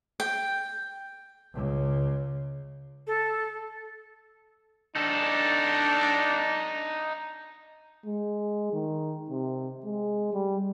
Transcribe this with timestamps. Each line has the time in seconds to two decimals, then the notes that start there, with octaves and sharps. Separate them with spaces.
0.20 G5
1.54 C#2 C#3
3.07 A4
4.95 D4 D#4 A4
8.06 G#3
8.73 D#3
9.30 C3
9.85 G#3
10.33 G3